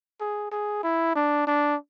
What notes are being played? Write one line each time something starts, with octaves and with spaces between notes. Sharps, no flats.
G#4
G#4
E4
D4
D4